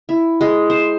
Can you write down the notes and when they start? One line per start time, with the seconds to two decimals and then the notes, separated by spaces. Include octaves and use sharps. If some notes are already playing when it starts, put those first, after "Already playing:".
0.09 E4
0.41 G#3
0.70 C5